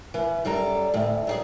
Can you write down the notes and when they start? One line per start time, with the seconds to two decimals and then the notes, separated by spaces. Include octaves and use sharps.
0.14 E3 B4
0.45 F#2 G3 A4 A#5
0.94 D2 A2
1.27 F#3 G3 G#4